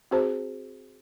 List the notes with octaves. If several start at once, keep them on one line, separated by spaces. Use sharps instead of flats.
C4 F#4 G#4 C5 A5 A#5